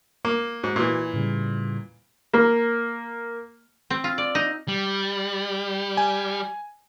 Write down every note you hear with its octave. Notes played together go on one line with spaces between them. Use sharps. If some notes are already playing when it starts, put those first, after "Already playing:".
A#3
G#2 F#4
A#2 E3
A2 C#3 G3
A#3
C4
F4
D5
D#4
G3
G#5